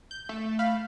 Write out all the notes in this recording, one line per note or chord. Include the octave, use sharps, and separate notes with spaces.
G6
A3
F5 B5 F6